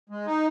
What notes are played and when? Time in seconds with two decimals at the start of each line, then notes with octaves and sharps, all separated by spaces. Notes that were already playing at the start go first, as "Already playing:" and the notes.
0.10 G#3
0.26 D#4